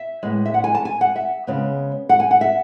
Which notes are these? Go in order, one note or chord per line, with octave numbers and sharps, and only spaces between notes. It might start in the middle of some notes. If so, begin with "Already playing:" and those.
Already playing: E5
A2 G#3 B3
E5
F#5
G#5
A5
G#5
F#5
E5
C#3 G#3 B3
F#5
G#5
F#5
E5